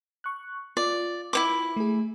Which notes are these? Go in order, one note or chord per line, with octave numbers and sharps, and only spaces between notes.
C#6 F#6
F4 D5
E4 C#5 D6
A3 G#4